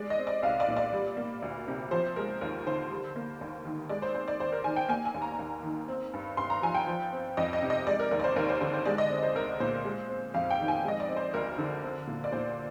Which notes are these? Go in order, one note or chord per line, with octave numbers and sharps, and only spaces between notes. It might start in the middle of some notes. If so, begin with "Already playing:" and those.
Already playing: G#3 D5
D#5
C4
D5
C2 F5
D5
A#2
D5
G3
A#3
D2
C3
F3 C5
G#3 A#4
D#2 A#4
D3 C5
G3
A#3
D#2
D#3
G#3 D5
C5
C4 C5
D5
D#2 C5
A#4
D#3 G#5
G5
A#3 G#5
G#5
D#2
A#5
D#2
D#3
C4
G2
G2 C6
A#5
F3 G#5
G5
F3
C4
F2 D#5
D#5
C3
D#5
G#3 D5
A#4
D#2 A#4
D5
C5
D#2 A#4
C5
D3 C5
C5
G#3 D5
D#5
C4
C5
C2 A#4
A#2 C5
G#3
C4
F2 F5
G5
D#3
G#5
G#3 D#5
D5
C4
C5
D2 A#4
D3
C4
A#2
D5
A#2 C5